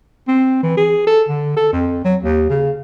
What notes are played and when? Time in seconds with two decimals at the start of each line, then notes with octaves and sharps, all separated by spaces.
0.28 C4
0.63 E3
0.77 G#4
1.07 A4
1.28 D3
1.56 A4
1.73 F2
2.04 F#3
2.23 D#2
2.50 C#3